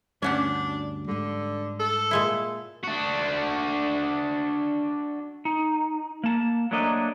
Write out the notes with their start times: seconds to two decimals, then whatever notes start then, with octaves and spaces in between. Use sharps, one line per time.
0.22 D2 G2 C#4 D4 F#4 G4
1.08 G#2 D3 G3
1.80 A4
2.11 A#2 G#3 E4
2.84 D4 F#4
5.45 D#4
6.24 A#3 A5
6.71 F#3 A3 A#3 D4 D#5